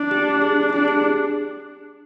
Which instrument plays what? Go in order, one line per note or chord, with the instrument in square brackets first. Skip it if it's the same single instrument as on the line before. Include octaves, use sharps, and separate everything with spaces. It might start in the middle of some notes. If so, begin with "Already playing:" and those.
Already playing: [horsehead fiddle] D4
[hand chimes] G4
G#4
[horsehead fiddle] D4 [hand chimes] G4
[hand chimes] G#4